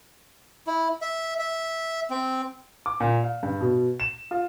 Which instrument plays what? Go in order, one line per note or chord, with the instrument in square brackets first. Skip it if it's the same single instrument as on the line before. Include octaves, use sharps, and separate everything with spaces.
[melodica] E4
E5
E5
C4
[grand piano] D6
A#2
F5
G2
B2
E7
F4